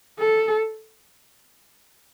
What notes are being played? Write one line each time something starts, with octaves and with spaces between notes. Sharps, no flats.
A4